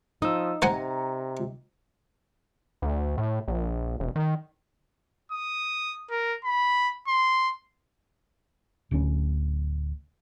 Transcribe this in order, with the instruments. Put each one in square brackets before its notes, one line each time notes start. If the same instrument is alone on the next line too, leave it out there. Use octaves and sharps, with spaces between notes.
[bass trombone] F3 [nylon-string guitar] D#4 [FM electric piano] D#6 E6
[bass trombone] C3 [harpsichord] C5 F#5 G#5 [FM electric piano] A#5
[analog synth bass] D2
A2
A#1
E1
D#3
[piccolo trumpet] D#6
A#4
B5
C6
[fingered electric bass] D1 D2 C4 C#4